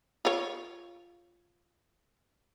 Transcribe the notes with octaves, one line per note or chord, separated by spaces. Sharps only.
F4 C#5